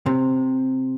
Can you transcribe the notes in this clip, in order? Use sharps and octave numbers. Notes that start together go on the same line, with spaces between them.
C3